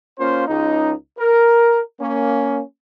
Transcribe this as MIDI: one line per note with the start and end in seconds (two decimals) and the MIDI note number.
0.20 0.47 58
0.20 0.47 61
0.20 0.47 65
0.20 0.47 72
0.48 0.92 37
0.48 0.92 63
1.19 1.79 70
2.00 2.61 58
2.00 2.61 61